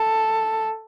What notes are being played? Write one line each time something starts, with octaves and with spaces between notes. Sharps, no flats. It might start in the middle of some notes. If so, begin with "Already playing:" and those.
Already playing: A4